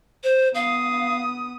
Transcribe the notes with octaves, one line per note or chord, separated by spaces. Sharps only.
C5
B3 F5 D#6